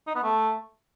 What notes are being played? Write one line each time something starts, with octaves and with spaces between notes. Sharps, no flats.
D#4
B3
A3